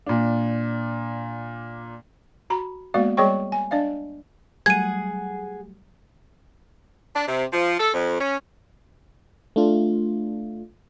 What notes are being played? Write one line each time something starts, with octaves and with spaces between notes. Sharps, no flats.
A#2 D4
F#4 A#5 B5
G#3 A#3 B3 F#4 D5 F5
G3 G#4 C#5 D#5 G5 C#6
G#5
D4 D5 D#5 F5
F#3 G3 A3 G#4 F#5 G#6 D#7
D4
C3
F3
A4
F2
C#4
A3 D4 F4